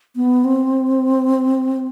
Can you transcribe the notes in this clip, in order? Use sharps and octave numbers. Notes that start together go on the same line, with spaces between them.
B3
C4